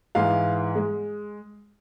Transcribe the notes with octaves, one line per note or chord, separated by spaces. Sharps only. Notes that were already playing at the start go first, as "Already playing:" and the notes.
G#2 E3 G#3 F5
G#3